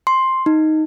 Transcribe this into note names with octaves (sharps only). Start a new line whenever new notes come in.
C6
D#4